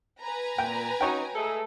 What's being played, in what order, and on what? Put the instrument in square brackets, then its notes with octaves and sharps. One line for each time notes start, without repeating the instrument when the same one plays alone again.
[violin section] B4 G#5 A#5
[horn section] A#2 [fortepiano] G5
[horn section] C#4 D#4 [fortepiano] F#4 C#5 G5
[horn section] G#3 G#4 [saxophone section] A3 A4